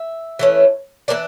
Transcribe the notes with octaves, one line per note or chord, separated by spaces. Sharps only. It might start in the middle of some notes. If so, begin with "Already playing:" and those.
Already playing: E5
E3 A3 C#4
E3 A#3 D4 D5